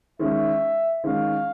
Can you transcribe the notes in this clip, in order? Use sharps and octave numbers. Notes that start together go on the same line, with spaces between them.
D#3 G#3 C#4 E5
D#3 G#3 C#4 F5